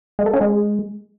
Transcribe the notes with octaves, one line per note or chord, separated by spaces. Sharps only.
G#3
A4
C#4
G#3